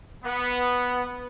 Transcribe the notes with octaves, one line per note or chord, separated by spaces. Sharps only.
B3